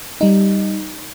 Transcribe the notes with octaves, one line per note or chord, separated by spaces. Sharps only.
G3 D#4